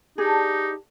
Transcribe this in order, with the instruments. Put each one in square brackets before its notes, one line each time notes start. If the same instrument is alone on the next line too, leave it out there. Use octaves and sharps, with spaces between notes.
[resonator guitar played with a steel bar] B3 D4 [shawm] D#4 [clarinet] G4 [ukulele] G#4